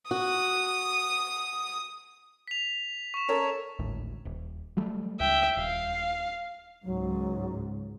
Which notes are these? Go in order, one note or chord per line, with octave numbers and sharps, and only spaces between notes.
F#4 D#6
B6 F7
C#6 E7
A4 A#4 C#5
G#1 D2 A2
D#1
F#3 G3 A3
C#2 E5 G5
D#1 F5
C#2 G#2 F#3